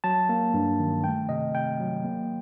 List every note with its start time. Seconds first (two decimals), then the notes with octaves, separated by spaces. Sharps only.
0.04 F#3 A5
0.29 A#3
0.54 G2
0.80 D#3
1.04 A3 G5
1.29 C3 D#5
1.55 C3 G5
1.80 F#3
2.05 A#3